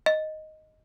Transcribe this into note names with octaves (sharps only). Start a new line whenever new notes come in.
D#5